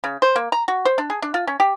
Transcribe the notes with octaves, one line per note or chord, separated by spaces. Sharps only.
C#3
C5
A#3
A#5
F#4
C5
D4
G#4
D4
F4
C#4
G4